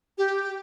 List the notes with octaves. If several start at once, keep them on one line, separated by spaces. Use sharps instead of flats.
G4